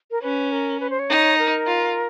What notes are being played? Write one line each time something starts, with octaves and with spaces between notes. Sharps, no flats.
A#4
C#4 B4
A#4
B4
C5
C#5
D#4
A#4
F4